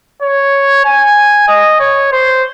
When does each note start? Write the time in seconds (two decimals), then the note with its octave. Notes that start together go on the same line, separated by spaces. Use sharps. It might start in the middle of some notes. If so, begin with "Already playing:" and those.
0.22 C#5
0.85 G#5
1.48 D#5
1.80 C#5
2.12 C5